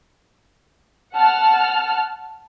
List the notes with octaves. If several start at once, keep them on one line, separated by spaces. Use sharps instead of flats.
F#5 A5 F6